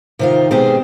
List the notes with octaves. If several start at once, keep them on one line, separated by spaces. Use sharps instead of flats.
C3 D#3 F4
B2 G#3 C4 G4 G#4